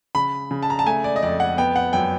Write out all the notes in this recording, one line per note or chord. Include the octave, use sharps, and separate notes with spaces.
C#3 B5
C#3
A5
A#5
A5
A3 G#5
D5
D#5
F2 D5
F#5
B3 G5
F#5
F#2 G5